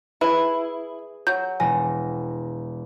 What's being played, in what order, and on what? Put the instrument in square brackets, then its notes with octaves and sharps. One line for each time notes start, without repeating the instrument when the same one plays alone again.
[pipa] E4 [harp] G#4 [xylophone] B4
[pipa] F#3 [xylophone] G6
[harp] E1 A#6 [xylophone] G#5